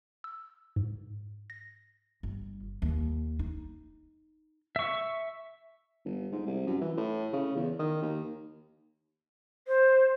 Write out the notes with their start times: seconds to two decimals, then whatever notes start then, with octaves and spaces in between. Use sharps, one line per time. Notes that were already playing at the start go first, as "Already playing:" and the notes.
0.24 E6
0.76 G#2
1.50 A#6
2.23 G1
2.82 D#2
3.39 D#4
4.76 E5 C#6
6.05 G1
6.32 G#2
6.46 C2
6.67 F#2
6.81 E3
6.97 A2
7.33 C#3
7.56 E2
7.79 D#3
8.02 D#2
9.68 C5